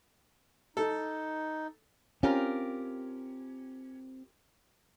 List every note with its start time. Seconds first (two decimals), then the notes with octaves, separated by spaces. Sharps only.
0.77 D#4 A4
2.23 C4 C#4 F4 G4 A#4